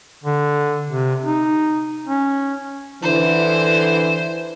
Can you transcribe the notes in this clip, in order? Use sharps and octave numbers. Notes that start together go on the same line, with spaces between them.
D3
C3
D#4
C#4
D3 E3 C5